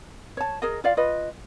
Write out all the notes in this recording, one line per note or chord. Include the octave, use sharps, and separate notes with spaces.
C#5 A5
G#4 A#4 D#5
F4 D5 F5
F4 B4 D#5